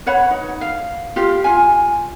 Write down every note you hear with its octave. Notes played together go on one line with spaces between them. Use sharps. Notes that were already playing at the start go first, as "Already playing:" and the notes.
B4 C#5 F#5 B5
D#4
F5
F4 G4 F5
F4 G#5